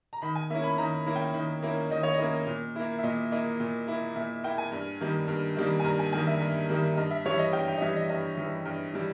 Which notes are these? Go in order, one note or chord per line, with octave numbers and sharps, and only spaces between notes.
A#5
D#3 B5
G#5
A#3 C#4 E4 E5
B5
D#3 A#5
A#3 C#4 E4
G5
D#3
A#3 C#4 E4
D#3 D#5
C#5
D#5
A#3 C#4 E4
A#2
A#3 E4
E5
A#2 D#5
A#3 E4 D#5
A#2
A#3 E4
A#2 E5
A#3 E4 G5
G#5
G2
D#3 G3 A#3
G2
D#3 G3 A#3
G#5
G2 A#5
G#5
D#3 G3 A#3 G#5
E5
G2
D#3 G3 A#3
G2 D#5
E5
E3 G3 C#5
D#5
G2 G5
G5
D#5
E3 G3 E5
D#5
G2 D#5
E3 G3
G2
E3 G3